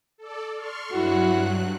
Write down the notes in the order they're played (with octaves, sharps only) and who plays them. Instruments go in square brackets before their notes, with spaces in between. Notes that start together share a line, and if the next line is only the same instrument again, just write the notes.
[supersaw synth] A4 D5
C6 C#6 F6
[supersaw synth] G2 F#3 F#6 [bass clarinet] E4 [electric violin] F#4